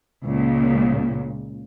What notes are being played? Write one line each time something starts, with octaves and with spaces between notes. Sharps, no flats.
C#2 A#2